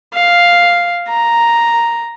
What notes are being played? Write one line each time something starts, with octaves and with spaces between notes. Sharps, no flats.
F5
A#5